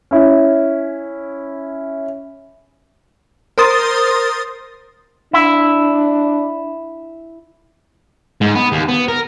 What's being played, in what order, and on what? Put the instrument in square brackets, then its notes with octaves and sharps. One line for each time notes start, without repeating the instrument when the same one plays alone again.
[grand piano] C#4 E4
[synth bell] A#4 C5 C6 D#6 A6
[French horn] D4 [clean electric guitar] E4
[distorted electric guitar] G#2
B3
D#2
B3
A#4